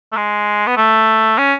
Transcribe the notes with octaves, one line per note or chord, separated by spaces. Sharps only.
A3
G#3
B3
A3
C#4